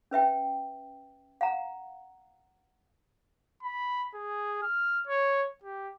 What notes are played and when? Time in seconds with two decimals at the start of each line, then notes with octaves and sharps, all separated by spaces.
0.11 C#4 B4 E5 G5
1.41 F5 F#5 A#5
3.63 B5
4.14 G#4
4.62 F6
5.07 C#5
5.64 G4